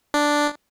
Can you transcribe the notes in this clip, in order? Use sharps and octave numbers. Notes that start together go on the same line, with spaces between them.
D4